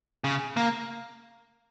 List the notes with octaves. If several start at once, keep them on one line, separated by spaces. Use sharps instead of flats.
C#3
A#3